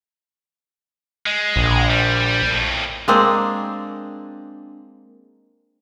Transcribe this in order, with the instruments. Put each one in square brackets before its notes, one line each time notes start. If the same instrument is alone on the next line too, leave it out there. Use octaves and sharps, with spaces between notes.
[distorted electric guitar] G#3
[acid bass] A#1
[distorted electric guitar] G3
F2 A2
[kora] G#3 A#3 C4 D4